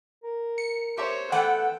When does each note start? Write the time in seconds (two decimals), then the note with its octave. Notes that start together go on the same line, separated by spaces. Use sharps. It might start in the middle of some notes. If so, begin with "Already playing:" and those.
0.24 A#4
0.58 C#7
0.97 G4 C5 C#5 E5 A#5
1.32 E3 A3 B3 A4 F#5 G5